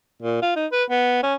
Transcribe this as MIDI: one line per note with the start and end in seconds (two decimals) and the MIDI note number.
0.22 0.41 46
0.42 0.52 65
0.56 0.66 63
0.72 0.83 71
0.90 1.22 59
1.23 1.34 61